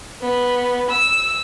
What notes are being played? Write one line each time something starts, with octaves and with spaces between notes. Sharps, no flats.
B3
E6